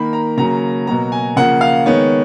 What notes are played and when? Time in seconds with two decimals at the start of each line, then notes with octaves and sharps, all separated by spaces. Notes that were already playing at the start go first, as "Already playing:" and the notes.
Already playing: D#3 A#3 B5
0.13 A#5
0.37 C#3 F#3 A#3 A#5
0.87 B2 F#3 A#3 A#5
1.12 G#5
1.36 C#3 F3 A#3 F#5
1.61 F5
1.86 D#3 G#3 B3 C#5